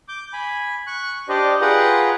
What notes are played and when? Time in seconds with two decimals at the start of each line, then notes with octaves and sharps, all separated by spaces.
0.08 D6 G6
0.33 G#5 B5
0.87 C#6 F#6
1.29 D4 G4 C5 D5 D#5
1.61 F4 G#4 B4 F#5 G5 A#5